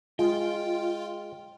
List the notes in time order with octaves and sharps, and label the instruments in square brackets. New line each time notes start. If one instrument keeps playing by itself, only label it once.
[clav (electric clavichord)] G#3 [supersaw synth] F4 [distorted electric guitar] G5